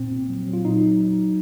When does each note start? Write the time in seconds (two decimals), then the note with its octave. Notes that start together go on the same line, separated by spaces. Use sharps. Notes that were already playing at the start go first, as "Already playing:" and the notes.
Already playing: A#2 C4
0.11 A#2
0.29 F#3
0.47 F#3
0.53 F4
0.65 F#3 D#4